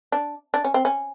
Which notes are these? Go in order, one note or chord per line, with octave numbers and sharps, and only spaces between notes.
D4
D4
C#4
C4
C#4